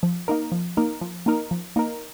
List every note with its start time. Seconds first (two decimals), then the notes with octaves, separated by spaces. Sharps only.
0.03 F3
0.28 A#3 D#4 A#4
0.52 F3
0.77 A#3 D#4 A#4
1.01 F3
1.26 A#3 D#4 A#4
1.51 F3
1.76 A#3 D#4 A#4